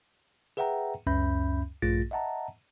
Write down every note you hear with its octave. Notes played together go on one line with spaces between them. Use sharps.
G#4 B4 E5 F#5 G5 A#5
C#2 F#2 C#4 E5 B5 G6
A#1 G2 A3 F4 A6 A#6
D#5 E5 F#5 A5 A#5